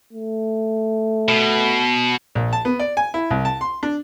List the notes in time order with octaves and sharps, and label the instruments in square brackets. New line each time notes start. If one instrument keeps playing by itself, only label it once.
[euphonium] A3
[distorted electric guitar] B2
[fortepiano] A#1
A5
B3
D5
G#5
E4
C2
A5
C6
D4